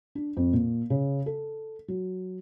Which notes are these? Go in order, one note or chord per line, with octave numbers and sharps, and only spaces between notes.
D4
F2
A#2
C#3
A4
F#3